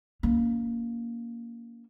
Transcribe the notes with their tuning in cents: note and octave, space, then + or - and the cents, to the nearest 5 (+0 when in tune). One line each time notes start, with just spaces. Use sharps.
A#3 +0 C#4 +35